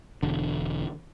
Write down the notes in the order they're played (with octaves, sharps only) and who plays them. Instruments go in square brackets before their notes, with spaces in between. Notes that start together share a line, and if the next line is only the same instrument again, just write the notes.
[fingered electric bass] E1 D3